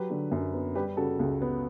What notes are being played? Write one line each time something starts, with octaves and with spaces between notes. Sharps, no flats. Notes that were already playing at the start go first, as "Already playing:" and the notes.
Already playing: F#3 G4 B4
D3
F#2
B3
G3 G4 B4
C#3 F#4 A4
C#2
B3